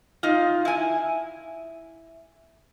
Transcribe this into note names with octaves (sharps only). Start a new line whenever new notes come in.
D#4 F4
E4 G#5